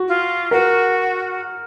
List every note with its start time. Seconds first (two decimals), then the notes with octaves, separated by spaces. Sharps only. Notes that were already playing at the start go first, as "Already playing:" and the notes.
Already playing: F#4
0.08 F4
0.51 F#4 A#4